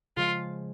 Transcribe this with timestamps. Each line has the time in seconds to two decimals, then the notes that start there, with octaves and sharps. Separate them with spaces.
0.17 C#3 F3 G#3 F4